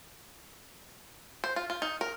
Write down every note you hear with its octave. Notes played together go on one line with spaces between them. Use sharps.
C5
F4
F4
D#4
A#4